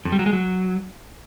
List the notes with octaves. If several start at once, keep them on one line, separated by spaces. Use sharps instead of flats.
F2
G3
F#3
G#3
F#3